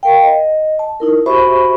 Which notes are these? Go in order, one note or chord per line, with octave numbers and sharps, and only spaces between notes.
A#4 F5 G5
D#5
A5
D#4 E4 A#4
F#4 G4 C5 E5 B5 C#6